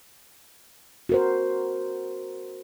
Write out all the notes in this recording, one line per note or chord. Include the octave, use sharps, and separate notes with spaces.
F#4 A#4 C5